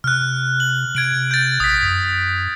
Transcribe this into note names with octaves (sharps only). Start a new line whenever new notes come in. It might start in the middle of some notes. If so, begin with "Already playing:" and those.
C3 F6 F#6
F#7
C3 G#6 D7 F#7
G6 A6
A#1 D#6 B6
F#2